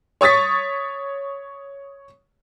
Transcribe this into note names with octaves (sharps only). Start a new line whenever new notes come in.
C#5 C#6 D#6 A6 B6